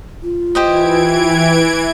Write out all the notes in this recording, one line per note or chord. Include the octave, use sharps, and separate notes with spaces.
F4
E3 G4 C5 D#5 G#6 D7